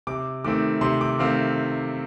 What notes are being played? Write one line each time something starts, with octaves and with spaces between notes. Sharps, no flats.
C3 D6
D#3 A3 C4 D6
C3 C6
D6
D#3 A3 C4 F5